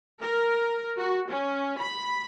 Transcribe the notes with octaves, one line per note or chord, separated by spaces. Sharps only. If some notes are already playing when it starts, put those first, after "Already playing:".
A#4
F#4
C#4
B5